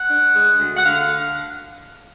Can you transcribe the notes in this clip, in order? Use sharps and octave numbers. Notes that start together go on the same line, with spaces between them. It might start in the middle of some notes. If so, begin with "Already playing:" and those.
Already playing: F#5
D4
G#3
D2
F#5
D3 F5